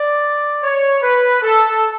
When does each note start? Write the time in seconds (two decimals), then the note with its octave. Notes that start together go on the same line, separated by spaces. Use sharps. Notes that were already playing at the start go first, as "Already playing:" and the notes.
Already playing: D5
0.63 C#5
1.02 B4
1.42 A4